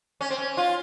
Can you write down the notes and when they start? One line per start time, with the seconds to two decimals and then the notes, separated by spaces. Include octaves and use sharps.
0.21 C#4
0.30 C4
0.38 C#4
0.57 F4